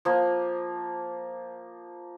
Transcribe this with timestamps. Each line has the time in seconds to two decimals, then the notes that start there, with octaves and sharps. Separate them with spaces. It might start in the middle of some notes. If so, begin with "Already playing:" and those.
0.05 F3 A#3